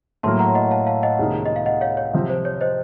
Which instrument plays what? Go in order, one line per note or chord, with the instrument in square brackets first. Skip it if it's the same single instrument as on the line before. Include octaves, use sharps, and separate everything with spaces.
[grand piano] A2 F#3 A#3 [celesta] A5 C6
[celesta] F#5 A#5
D#5 F#5
F5 A5
F5 A5
D#5 F#5
[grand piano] C#2 C3 D#3 A#3 D#4
[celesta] D#5
F5
D#5 F#5
C#5 F5
C#5
[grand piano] C3 F3 C4
[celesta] C5
C#5
C5 D#5